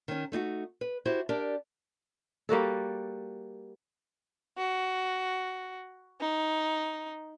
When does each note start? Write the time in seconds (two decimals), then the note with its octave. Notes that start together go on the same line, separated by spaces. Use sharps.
0.08 D#3 C#4
0.32 A3 D#4 F4 F#4
0.81 B4
1.05 E4 F#4 G4 C5
1.29 D4 G4 A#4 D5
2.49 G3 A#3 F#4 A4
4.58 F#4
6.20 D#4